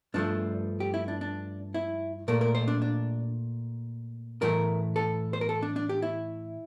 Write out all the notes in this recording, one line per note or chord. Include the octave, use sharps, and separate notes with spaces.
G2 F3 A3 D4
G4
E4
D4
D4
E4
A#2 A3 A#4
A#4
C5
D4
D4
A2 E3 A3 A#4
A4
C5
A#4
A4
D4
D4
G4
E4